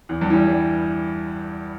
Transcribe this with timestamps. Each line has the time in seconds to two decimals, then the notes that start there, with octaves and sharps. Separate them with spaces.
0.09 E2
0.21 G2
0.30 E3
0.34 G3
0.48 G3